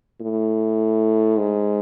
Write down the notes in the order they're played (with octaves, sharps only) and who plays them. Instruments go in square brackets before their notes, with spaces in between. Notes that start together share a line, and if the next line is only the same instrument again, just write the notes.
[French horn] A2
G#2